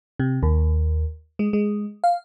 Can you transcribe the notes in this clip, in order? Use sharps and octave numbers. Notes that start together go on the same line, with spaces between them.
C3
D#2
G#3
G#3
F5